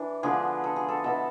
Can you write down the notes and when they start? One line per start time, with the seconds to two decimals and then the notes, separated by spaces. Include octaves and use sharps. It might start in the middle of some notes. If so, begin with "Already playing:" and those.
Already playing: E3 D4
0.23 D3 F3 B3 E4 G#4
0.64 A4
0.76 G#4
0.89 A4
1.04 B2 B3 E4 A4